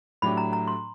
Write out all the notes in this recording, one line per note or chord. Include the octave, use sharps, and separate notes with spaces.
A2 F#3 A3 D4 G4 B5
A#5
A#5
C6